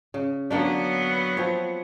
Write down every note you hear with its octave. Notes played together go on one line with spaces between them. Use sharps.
C#3
D3 F#3 A#3 B3 D4
F3 C4 C#5